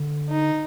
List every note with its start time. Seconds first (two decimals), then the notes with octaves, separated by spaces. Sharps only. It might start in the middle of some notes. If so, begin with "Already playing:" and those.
Already playing: D3
0.30 D#4